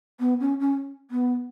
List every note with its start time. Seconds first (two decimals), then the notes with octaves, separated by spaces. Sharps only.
0.20 B3
0.40 C#4
0.60 C#4
1.11 B3